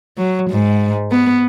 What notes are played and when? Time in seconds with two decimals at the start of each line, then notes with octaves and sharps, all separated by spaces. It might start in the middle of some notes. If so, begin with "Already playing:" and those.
0.18 F#3
0.51 G#2
1.11 B3